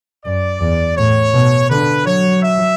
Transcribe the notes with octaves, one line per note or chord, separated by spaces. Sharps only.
F#2 D5
E2
A2 C#5
B2
D3 B4
F#3 C#5
E5